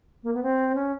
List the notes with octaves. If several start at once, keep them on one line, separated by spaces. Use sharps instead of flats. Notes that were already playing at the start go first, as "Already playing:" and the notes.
A#3
B3
C4
C#4